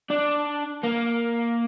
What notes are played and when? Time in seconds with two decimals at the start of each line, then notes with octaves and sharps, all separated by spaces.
0.10 D4
0.84 A#3